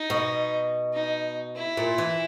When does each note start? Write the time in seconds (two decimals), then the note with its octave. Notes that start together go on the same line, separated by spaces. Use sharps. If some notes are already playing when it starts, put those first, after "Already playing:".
Already playing: D#4
0.10 B2
0.93 D#4
1.56 E4
1.77 A#2
1.98 E3